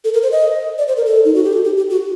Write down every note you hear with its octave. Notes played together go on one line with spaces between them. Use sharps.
A4
A#4
C5
D#5
D5
C5
A#4
A4
D#4
F#4
G4
A4
G4
G4
F#4